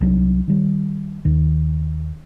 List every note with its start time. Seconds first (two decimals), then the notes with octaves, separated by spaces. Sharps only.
0.01 C2 F#3 C4 D4
0.48 D#3 G3
1.25 D#2 D#3